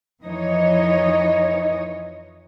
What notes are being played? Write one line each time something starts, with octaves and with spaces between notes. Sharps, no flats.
F2 E3 F3 D#4 C#5 D#5